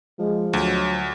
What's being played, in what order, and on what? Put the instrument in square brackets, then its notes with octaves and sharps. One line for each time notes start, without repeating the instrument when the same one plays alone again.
[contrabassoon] F3 [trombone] G#3
[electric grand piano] D2 [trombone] F#3